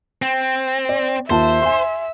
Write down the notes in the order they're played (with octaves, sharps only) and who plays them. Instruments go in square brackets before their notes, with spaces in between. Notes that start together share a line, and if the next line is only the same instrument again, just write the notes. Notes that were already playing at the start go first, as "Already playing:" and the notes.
[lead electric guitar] C4
[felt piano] D5
[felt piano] D#2 F4 A5 [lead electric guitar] C5 [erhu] E5
[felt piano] G#5 C6